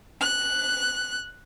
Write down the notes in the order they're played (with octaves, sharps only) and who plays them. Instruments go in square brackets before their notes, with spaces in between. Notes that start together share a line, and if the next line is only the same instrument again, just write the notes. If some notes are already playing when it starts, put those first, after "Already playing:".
[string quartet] F#6